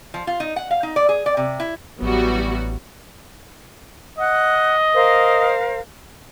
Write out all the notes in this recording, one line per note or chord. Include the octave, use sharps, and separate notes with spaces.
F3
F4
D#4
F#5
F5
D#4
D5
G#4
D5
C3
E4
A1 E3 F#3 G3 B3 F#4
D#5 F#5 F#6
A#4 C5 F5